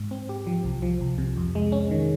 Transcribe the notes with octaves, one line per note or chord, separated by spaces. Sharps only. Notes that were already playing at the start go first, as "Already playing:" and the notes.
Already playing: G#2
C4
G4
F3
C2
F3
C2
C3
F2
G#3
C#4
D#3